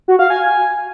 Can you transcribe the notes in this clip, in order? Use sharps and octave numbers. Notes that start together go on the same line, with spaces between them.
F#4
F5
G#5